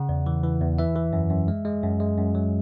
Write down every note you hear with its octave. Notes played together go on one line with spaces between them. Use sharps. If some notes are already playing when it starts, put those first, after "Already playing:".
Already playing: C#3 F#5
E2
E3
E3
E2
E3 E5
E3
F#2
F#2
G#3
G#3
F#2
G#3
F#2
F#3